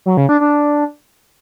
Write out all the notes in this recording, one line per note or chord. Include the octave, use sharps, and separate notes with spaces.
F#3
C#3
D4
D4